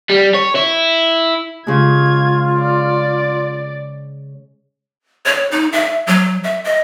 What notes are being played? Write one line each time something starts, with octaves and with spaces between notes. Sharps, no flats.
G3
C#5
E4
C#3 G#3 F4 G#6
D5
C#5
D#4
E5
F#3
E5
D#5